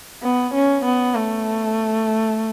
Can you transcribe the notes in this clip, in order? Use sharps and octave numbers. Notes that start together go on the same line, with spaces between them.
B3
C#4
B3
A3